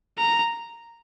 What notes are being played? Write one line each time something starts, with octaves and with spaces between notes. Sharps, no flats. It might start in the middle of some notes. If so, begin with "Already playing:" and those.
A#5